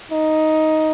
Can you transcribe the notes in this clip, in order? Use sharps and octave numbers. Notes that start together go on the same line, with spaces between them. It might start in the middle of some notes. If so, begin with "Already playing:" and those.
D#4